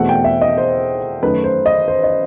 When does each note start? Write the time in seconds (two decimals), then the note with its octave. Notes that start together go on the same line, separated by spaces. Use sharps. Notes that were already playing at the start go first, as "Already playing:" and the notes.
Already playing: E2 B2 A3 C4 E4 F#5
0.09 G5
0.24 E5
0.41 D#5
0.58 C5
1.23 F#2 D#3 A3 D#4 B4
1.44 C5
1.66 D#5
1.88 C5
2.04 D#5